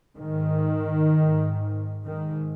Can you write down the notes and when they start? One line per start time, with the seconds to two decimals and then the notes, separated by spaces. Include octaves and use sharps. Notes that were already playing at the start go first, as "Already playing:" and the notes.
0.16 G#2 D#3
1.11 G#2
2.06 G#2 D#3